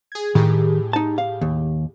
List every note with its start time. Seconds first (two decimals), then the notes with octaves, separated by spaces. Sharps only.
0.12 G#4 G#6
0.35 A2 D#3 G4 G#4
0.93 D#4 A5
1.18 F5
1.41 D#2